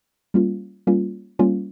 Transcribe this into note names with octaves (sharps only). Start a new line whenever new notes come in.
G3 A#3 C#4 F4
G3 A#3 C#4 F4
G3 A#3 C#4 F4